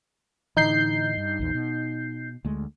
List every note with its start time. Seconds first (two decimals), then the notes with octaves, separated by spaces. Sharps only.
0.57 A2 D3 E3 D#4 G6 C7
1.17 G2
1.39 A#1 E2
1.54 B2
2.45 D2 G#3 A3